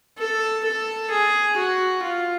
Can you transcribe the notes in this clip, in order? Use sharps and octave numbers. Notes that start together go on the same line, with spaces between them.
A4
A4
G#4
F#4
F4